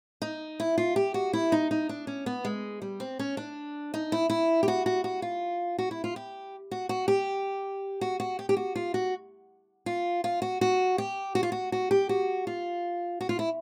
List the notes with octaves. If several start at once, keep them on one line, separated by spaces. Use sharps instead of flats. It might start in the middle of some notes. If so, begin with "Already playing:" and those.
D#4
E4
F4
G4
F#4
E4
D#4
D#4
D4
C#4
B3
G#3
G3
C4
C#4
D4
D#4
E4
E4
G4
F#4
F#4
F#4
F4
F#4
E4
F4
G4
F#4
F#4
G4
F#4
F#4
G4
G4
F#4
F4
F#4
F4
F4
F#4
F#4
G4
F#4
F4
F#4
F#4
G4
F#4
F4
F#4
F4
E4